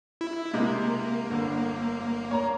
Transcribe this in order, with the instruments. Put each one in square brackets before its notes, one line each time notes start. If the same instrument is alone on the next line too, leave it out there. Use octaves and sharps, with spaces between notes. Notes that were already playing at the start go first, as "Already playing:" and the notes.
[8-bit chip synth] E4
[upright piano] C3 G#3 [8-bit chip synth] A#3
[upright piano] G1 D3
C#5 A#5